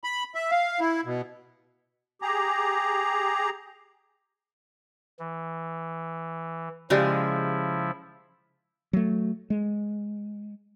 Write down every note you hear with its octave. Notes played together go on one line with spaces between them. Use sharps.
B5
E5
F5
E4
B2
G4 G#4 A#5
E3
C#3 F3 G#3 E4 G4 D5
F#3 A3
G#3